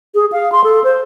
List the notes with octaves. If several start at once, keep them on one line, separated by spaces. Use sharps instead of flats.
G#4
F5
C6
A4
C5